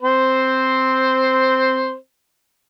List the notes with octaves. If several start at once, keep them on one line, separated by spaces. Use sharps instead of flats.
C4 C5